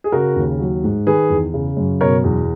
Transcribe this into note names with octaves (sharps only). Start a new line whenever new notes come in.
G#4
C#3 F#4 A#4
D#2
F#3
G#2
D#3 G#4 B4
E2
C#3
F#2
B2 A#4 C#5
E2